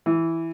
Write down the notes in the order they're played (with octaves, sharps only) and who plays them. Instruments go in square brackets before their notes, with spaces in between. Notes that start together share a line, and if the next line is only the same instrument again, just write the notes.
[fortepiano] E3